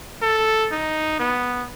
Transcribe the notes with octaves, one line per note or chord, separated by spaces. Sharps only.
A4
D#4
B3